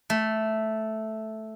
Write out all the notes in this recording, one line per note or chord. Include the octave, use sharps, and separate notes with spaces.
A3